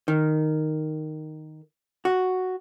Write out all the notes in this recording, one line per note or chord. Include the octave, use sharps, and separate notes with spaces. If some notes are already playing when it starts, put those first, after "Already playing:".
D#3
F#4